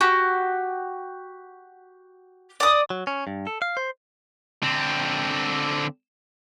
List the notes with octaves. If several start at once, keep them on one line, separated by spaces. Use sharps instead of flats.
F#4 G4
D5 D#6
F#3
C#4
G2
A4
F5
C5
D3 C4